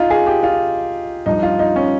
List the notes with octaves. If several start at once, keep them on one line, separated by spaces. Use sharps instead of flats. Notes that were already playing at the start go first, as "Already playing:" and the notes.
Already playing: D#4 F4
G#4
G4
F4
G2 F3 D#4
F4
D#4
C#4